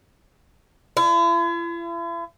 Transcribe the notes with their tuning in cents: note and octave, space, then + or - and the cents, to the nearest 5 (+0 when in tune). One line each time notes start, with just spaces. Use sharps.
E4 +45